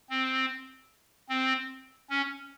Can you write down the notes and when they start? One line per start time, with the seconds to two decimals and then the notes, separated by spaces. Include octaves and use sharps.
0.09 C4
1.29 C4
2.10 C#4